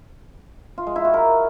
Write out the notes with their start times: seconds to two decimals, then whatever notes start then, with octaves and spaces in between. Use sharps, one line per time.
0.78 F4
0.87 G#3
0.96 E4
1.05 F#4
1.14 A#4